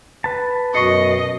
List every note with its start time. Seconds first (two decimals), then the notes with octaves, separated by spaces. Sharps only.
0.24 B4 A5
0.75 F#2 B2 D#5 C#6 C7 C#7